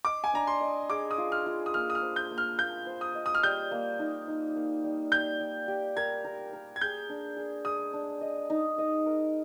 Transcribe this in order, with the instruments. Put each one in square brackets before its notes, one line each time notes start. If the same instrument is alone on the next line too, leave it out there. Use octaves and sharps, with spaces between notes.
[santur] D#5 [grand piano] D6
[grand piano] G#5
[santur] D4 [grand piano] A#5
[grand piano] C6
[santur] D#5
[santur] G#4 [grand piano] D6
[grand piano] D#6
[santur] F4
[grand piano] F6
[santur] F4
[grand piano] D#6
[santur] A#3 [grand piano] F6
[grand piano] D#6
F6
[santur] C5
[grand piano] G6
[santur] A#3
[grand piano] F6
[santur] A#3 [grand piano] G6
[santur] C5
[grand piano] D#6
[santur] D#5
[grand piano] D#6
F6
[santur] G3 [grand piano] G6
[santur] A#3
D#4
D#4
A#3
G3
[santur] G4 [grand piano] G6
[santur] G3
G4
[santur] A#4 [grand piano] G#6
[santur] A#4
A#4
[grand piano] G#6
[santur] G#4 [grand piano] G6
[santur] D4
G#4
[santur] G#3 [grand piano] D#6
[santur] D4
D#5
D#4
D#5
A#4